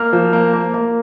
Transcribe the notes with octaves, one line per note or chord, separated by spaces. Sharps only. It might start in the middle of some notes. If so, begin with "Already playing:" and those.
Already playing: A#3 F6
F3
A#3
A#3
A#3